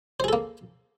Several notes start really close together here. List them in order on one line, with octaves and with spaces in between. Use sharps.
C5 G#4 A4 A#3